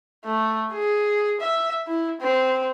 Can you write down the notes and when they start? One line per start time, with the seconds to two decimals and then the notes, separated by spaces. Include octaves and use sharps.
0.25 A3
0.73 G#4
1.40 E5
1.87 E4
2.21 C4